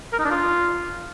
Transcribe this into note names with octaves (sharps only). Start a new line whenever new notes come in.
A#4
D#4
D4
F4